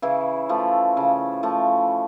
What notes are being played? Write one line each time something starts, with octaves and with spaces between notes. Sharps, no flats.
C#3 E3 E4
F3 A3
C#3
F3 A3